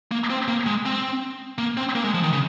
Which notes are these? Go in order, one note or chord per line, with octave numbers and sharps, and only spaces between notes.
A#3
C4
A#3
G#3
C4
A#3
C4
A#3
G#3
F3
D#3
C#3